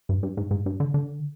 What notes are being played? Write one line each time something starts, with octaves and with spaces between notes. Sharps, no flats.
G2
G2
G#2
G#2
G2
D3
D3